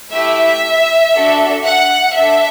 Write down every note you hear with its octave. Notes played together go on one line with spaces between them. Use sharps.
A3 E4 G4 E5
D4 F#4 A4
F#5
D4 A4 E5